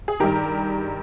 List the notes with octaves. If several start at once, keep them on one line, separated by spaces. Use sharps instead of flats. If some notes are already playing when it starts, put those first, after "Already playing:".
G#4
G2 D#3 G4 A#4